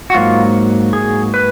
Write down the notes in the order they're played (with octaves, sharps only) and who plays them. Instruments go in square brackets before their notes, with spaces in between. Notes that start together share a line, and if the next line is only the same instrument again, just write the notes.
[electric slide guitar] F#4
G#2 F#3 A#3 F4
G#4
B4